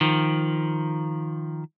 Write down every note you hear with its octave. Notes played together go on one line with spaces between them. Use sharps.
D#3 F3